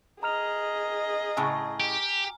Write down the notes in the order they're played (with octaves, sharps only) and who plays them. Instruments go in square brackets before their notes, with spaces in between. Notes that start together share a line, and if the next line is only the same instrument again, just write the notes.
[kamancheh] G#4 D#5 [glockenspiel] A#5 F6 F7
[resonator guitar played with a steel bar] A2 C#3 [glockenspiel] G#5
[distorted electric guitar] G4